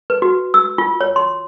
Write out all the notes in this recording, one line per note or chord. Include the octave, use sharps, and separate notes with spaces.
B4
F#4
E6
F4
C#5
C6